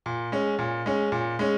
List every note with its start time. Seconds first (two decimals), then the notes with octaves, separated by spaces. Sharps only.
0.06 A#2
0.32 G#3 C#4
0.59 A#2
0.86 G#3 C#4
1.12 A#2
1.39 G#3 C#4